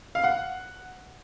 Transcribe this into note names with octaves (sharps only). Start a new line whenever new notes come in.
F5
F#5